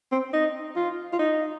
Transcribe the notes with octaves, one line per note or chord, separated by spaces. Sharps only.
C4
D#4
F4
F4
D#4